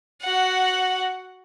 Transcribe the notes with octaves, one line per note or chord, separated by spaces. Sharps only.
F#4 F#5